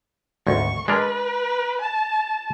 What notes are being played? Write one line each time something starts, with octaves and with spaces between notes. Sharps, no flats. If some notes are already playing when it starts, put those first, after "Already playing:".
G#1 D2 C#6
G#3 D4 A#4 B4
A5